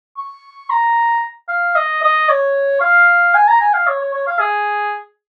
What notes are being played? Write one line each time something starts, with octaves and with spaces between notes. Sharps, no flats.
C#6
A#5
F5
D#5
D#5
C#5
F5
G#5
A#5
G#5
F5
C#5
C#5
C#5
F5
G#4